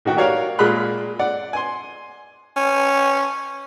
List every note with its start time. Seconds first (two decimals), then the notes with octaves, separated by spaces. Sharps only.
0.05 A2 D#3 F#4 G5
0.17 F#4 G4 A#4 C#5 D5 F5
0.59 A#2 G#3 F4 G#4 B5 F#6
1.19 D5 F#5
1.53 G#5 C6
2.57 C#4